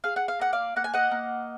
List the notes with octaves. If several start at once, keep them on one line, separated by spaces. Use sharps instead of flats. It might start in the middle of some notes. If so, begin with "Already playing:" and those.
G#4 F5
F#5
F5
A#3 F#5
D5 F5
A#3 F#5
G#5
D#5 F#5
A#3